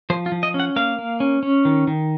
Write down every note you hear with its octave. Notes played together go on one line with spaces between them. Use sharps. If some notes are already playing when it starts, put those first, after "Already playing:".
F3 C5
F4
F3
D#5
C#4
F#5
A#3 F5
A#3
C#4
C#4
D#3
D#3